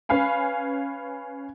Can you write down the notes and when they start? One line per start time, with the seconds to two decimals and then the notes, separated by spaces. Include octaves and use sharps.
0.09 C#4 B4 F5 G#5 B5